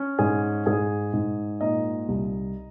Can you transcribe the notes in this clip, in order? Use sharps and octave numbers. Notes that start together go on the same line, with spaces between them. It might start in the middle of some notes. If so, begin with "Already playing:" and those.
Already playing: C#4
G#2 G#4 G#5
G#2 G#4 G#5
G#2
A#2 D#4 D#5
C2